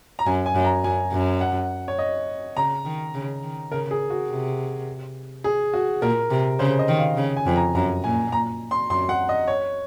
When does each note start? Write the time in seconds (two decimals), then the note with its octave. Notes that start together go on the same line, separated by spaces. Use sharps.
0.19 A#5
0.26 F#2 G#5
0.46 G#5
0.55 F#2
0.64 A#5
0.84 F#2 G#5
1.12 F#2
1.41 F#5
1.88 C#5
1.99 D#5
2.57 C#3 A#5
2.85 D#3
3.14 C#3
3.43 D#3
3.72 C#3 A#4
3.91 G#4
4.10 F#4
4.29 C3
5.44 G#4
5.74 F#4
6.02 A#2 A#4
6.30 C3
6.59 C#3 C5
6.79 D#5
6.88 D#3
6.99 F5
7.17 C#3
7.36 G#5
7.46 F2
7.56 A#5
7.75 F#2 A#5
8.03 A#2 G#5
8.32 A#5
8.71 C6
8.90 F#2 C6
9.09 F#5
9.29 D#5
9.48 C#5